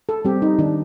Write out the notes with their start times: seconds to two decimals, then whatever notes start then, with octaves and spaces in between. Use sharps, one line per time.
0.09 A4
0.25 G3 C4 G4
0.42 D#4
0.59 D#3 D4